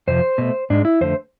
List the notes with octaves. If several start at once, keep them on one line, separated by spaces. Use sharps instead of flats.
F2 C3 F3 C5
B2 A3
G#2 G#3 D4
E4
F2 D3 A3 C5